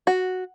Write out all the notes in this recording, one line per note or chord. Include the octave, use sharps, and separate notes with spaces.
F#4